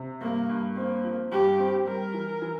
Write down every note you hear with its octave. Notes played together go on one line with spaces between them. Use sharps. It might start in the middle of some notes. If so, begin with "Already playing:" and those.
Already playing: C3
G2 A#3
G2
A#3 C4
F3
G2 G4
C4
G3 A#4
E3
E3